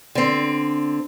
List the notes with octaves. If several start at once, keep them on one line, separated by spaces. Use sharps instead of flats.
D3 C4